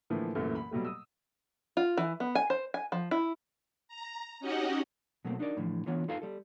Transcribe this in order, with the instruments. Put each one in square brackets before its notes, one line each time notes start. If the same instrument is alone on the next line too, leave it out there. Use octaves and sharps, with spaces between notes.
[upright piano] A2 D3 E3 F3 A3 A#3
C2 F#2 A#2 E3 A3 A#3
B5
B2 F#3 G3 A3
D#6 E6
[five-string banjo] F4
E3
B3
G#5
C5
G#5
F3
E4
[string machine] A#5
C#4 D#4 F#4 G4 D#5 F#5
[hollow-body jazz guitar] B2 F#3 A3 A#3 C4
D4 D#4 F#4 A#4 D5
A2 D3 E3 F3
D3 E3 B3 F4 C#5
D#4 F4 A4 B4 F5
G3 A4